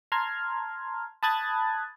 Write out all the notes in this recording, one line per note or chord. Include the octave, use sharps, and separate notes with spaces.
A5 A#5 C6 F6 G#6
A5 B5 D#6 F#6 G#6 A6